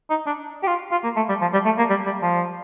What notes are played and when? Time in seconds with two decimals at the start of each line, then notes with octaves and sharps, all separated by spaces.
0.10 D#4
0.26 D4
0.63 G4
0.67 F4
0.91 F4
1.04 A#3
1.16 A3
1.29 G3
1.41 F3
1.53 G3
1.65 A3
1.78 A#3
1.90 G3
2.06 G3
2.22 F3